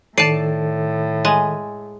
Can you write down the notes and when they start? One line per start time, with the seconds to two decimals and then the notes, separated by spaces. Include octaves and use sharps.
0.18 A2 D#3 A4 D5 A5 C7 D#7
1.25 G#3 G#5